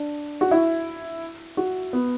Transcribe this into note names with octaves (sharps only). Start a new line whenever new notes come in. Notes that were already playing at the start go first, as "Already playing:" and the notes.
Already playing: D4
F#4
E4
F#4
B3